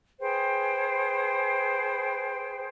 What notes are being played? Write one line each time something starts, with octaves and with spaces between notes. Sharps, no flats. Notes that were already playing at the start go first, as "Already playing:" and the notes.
G#4 B4 C5 G5